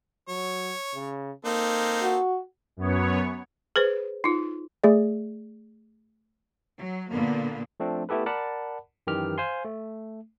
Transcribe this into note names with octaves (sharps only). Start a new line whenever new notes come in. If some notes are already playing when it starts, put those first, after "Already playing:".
F#3 C#5
C#3
A#3 C4 D#4 A4
F#4
F#2 B3 C#5
G#4 B4 C5
D#4 F4
A3 G#4 D5
F#3
A#2 D3 A#3 B3
F3 A3 C4 D4
A3 B3 E4 G4 A4 B4
A#4 D5 F#5 A5 B5
F#2 D#3 E3 G4 F6
C5 F5 G#5 C6
A3